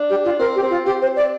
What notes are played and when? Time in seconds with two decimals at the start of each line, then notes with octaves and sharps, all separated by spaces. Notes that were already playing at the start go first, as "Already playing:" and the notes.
Already playing: D4
0.09 G4
0.24 F4
0.39 C4 A#4
0.55 G4
0.63 C4
0.69 F4
0.85 C4 G4
1.01 C5
1.16 D5